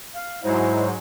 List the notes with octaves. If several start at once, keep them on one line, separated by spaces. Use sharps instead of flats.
F5
G#2 F#3 G#3 E4 C5